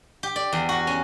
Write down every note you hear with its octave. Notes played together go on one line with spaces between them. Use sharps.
G4
D5
E2
F#4
C#4